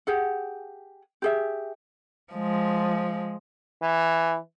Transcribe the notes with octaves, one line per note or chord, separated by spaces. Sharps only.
G4 G#4 F#5
G4 G#4 E5
F3 G#3
E3